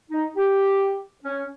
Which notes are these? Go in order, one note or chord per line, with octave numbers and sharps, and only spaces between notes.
D#4
G4
C#4